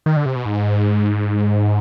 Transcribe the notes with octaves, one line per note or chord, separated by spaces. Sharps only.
D#3
D3
C3
B2
G#2